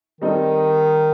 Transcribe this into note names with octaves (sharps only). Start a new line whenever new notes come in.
D#3 G3 C4 D#4 A4 D#5